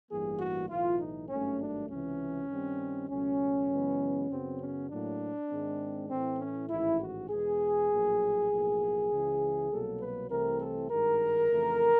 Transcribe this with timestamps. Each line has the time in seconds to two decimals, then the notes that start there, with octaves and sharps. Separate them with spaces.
0.09 A1 G2 E3 G3 A#3 G#4
0.39 F#4
0.69 B1 A2 E3 F4
0.99 D#4
1.29 G#1 G2 D#3 F#3 A3 C#4
1.60 D4
1.89 C#2 C3 E3 C#4
2.50 G2 D#3 G3 C4
3.10 C#2 B2 F#3 A3 C#4
3.69 F#2 C#3 E3 G#3 B3
4.29 F#2 C#3 F#3 B3 C4
4.60 C#4
4.90 A2 F#3 A#3 D4
5.50 G#2 D#3 G#3 C4
6.10 A2 E3 A3 C4
6.40 C#4
6.70 A1 G#2 D#3 E4
7.00 F#4
7.30 E2 B2 G#3 B3 G#4
7.90 A#1 A2 F#3 A#3
8.50 B1 A2 F3 A#3
9.10 C#2 C#3 E3
9.70 C2 B2 F#3 A#3 A4
10.00 B4
10.30 C2 C3 E3 A3 C4 A#4
10.60 A4
10.90 G#1 G2 D#3 G#3 A#4
11.50 F2 C#3 E3 A3